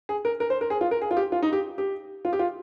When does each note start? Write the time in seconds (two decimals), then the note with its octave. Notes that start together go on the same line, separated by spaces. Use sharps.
0.09 G#4
0.25 A#4
0.40 A#4
0.50 C5
0.61 A#4
0.70 G#4
0.81 F4
0.91 A#4
1.02 G#4
1.11 F4
1.17 G4
1.32 F4
1.43 D#4
1.53 G4
1.78 G4
2.25 F4
2.33 G4
2.39 F4